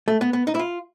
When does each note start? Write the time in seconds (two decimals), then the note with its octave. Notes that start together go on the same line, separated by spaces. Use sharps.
0.08 A3
0.21 B3
0.33 B3
0.47 D#4
0.55 E4
0.59 F4